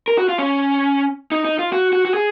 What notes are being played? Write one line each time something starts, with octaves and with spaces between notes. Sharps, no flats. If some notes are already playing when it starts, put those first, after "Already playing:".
A#4
F#4
F4
C#4
D#4
D#4
F4
F#4
F#4
F#4
G#4